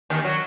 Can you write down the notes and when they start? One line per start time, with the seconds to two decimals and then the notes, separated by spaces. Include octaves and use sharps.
0.10 D#2 D#3
0.24 F#3